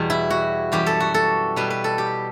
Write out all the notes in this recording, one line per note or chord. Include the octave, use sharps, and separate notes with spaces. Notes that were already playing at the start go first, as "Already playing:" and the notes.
Already playing: E2 B2 G3
E4
F#4
F#2 E3 G3 G4
A4
F#4
A4
B2 G3 B4
B4
A4
G4